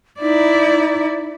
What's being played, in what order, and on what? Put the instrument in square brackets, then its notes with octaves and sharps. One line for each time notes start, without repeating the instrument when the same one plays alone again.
[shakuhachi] D#4 [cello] E4 D5